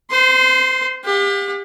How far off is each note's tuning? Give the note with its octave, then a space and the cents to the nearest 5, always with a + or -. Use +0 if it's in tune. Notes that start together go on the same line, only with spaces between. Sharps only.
C5 -30 C6 +0
G4 +30 F#5 -45